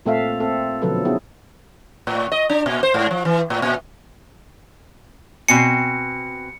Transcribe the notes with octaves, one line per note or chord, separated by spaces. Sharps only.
A#2 A3 C4 A4 E5 F5
C4 A4
B2 D3 F3 F#3 A4 B4
B3 C#4 E4 G#4
A2
D#5
D4
A#2
C5
G#2
F3
E3
A2
A#2
B2 C4 G#5 C#7